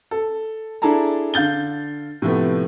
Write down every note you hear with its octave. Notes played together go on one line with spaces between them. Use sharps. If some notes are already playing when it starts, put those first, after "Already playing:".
A4
D4 E4 G#4 A4 A5 A#5
D3 F5 G6 A6 G7
A2 C3 F3 A3 B3